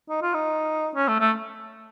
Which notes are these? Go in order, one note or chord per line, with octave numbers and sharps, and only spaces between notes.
D#4
F4
D#4
C#4
A3
A3